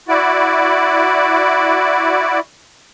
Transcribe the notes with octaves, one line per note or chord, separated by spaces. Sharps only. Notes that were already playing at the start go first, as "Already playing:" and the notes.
E4 F#4 D5